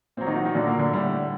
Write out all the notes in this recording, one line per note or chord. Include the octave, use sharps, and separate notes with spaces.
A#2 F#3 C4
D#3 D#4
F#3 F#4
D#3 D#4
A#2 D3 F#3 D4
A#3
D3 D4
A2 G3